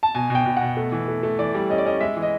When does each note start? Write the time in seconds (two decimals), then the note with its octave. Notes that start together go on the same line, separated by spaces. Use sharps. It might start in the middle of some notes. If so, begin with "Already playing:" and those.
0.03 A5
0.15 B2 G#5
0.30 B2
0.35 G5
0.46 B2
0.57 B2 F#5
0.77 A3
0.92 E3
1.08 A3
1.23 A3
1.39 E3 D5
1.55 G3
1.70 C#4 D#5
1.78 D5
1.85 C#4 D#5
2.01 G#3 E5
2.16 E3
2.22 D#5